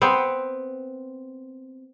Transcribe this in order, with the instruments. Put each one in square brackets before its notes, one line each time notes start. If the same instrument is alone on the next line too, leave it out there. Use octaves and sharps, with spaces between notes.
[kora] B3 C4